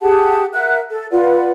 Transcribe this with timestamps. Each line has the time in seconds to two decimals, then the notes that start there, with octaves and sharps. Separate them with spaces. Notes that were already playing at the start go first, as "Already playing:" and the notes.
0.01 G4 G#4 F#5 A5
0.52 A#4 E5 F#5 F#6
0.90 A4
1.11 F4 B4 D5 F#5